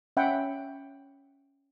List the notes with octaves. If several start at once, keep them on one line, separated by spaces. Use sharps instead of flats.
C#4 E5 F#5 G5 B5